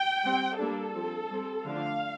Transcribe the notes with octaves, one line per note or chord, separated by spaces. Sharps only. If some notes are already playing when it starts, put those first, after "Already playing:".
Already playing: G5
G3 C4
G3 A#3 D4 A4
F3 C4
G3 C4
D3 F3 A3 D4 F5